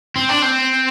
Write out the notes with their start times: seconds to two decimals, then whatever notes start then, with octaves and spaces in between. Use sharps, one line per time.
0.16 C4
0.29 D4
0.42 C4